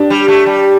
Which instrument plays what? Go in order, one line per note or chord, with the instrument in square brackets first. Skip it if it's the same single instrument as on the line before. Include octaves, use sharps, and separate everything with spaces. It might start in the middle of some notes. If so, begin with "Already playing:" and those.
Already playing: [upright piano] D4 G4
[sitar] G3
A3
G3